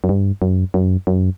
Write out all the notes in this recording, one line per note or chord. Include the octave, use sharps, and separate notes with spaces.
F#2
G2
F#2
F#2
F#2